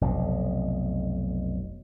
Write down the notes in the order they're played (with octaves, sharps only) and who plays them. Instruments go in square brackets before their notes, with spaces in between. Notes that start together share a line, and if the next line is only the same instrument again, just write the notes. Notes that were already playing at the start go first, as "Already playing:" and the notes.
[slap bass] F1 B1 B2